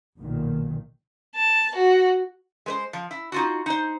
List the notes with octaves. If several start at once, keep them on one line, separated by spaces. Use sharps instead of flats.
B1 A#2 D#3
A5
F#4
G#3 B4 C5
F3
E4
D#4 F4 F#4
D#4 C5